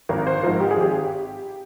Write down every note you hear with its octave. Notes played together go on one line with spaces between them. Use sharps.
G#1 A#4
C5
G#2 F3 A#4
G4
G#4
G#1 G4